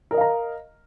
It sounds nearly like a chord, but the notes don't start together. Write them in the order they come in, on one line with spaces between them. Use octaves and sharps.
A#4 D#5 F5 A#5